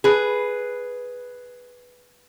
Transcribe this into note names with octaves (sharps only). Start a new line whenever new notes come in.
G#4 B4